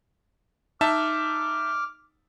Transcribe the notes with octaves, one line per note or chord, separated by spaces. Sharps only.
D#4 E5 A5 D6 F6